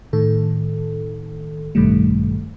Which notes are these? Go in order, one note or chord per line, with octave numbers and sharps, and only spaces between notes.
A2 D#3 A4
A1 G2 B2 D#3 G3 A3